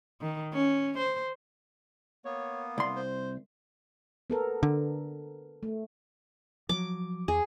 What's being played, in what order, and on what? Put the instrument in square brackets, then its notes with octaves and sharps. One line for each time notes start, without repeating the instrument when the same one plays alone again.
[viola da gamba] D#3
C#4
C5
[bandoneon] A#3 B3 [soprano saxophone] C#5
[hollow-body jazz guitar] C2 C6 [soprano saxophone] D5
[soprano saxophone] C5
[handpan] B3 A4 A#4
[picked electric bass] D3
[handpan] A3
[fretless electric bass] F3 F#3 [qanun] D6
[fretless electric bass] E2 [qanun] G#4